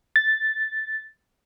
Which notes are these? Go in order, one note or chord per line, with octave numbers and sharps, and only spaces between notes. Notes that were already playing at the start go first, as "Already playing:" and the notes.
A6